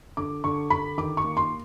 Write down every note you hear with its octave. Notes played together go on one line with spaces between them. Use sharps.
D3 D6
D3 C#6
D3 B5
D#3 D6
C#6
A#3
C6